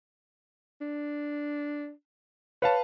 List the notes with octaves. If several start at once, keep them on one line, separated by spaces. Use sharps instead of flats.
D4
B4 C#5 F5 A5